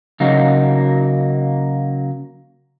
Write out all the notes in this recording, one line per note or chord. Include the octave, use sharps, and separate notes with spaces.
C#3 F#3 A#3 D#4 F#4